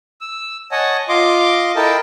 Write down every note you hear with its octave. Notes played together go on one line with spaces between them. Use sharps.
E6
C#5 D#5 F#5 G#5 A5
F4 D#5 C6 D6
E4 A4 A#4 D#5 G5 A5